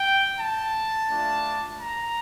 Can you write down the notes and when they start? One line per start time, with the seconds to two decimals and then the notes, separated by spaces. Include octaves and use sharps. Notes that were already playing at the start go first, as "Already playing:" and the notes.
Already playing: G5
0.37 A5
1.08 A3 D4 F4
1.80 A#5